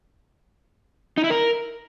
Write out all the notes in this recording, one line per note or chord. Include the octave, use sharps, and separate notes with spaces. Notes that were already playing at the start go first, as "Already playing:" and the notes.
D#4
E4
A#4